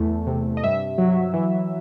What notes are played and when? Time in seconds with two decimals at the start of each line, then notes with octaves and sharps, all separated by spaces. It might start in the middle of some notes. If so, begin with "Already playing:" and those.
Already playing: E2 A3
0.27 C3
0.57 D#5
0.63 G2 E5
0.98 F#3
1.33 E3